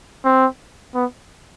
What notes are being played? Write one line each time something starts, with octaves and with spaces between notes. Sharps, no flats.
C4
B3